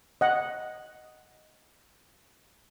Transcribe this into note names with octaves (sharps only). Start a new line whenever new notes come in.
D#5 F#5